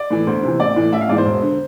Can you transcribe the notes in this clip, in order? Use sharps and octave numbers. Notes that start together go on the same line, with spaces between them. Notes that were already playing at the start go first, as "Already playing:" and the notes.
Already playing: D5
A2 E3
D2 C5
C3 E3
A1 D5
A2 E3
A1 E5
F5
G#2 E3 D5
C5
E1
D3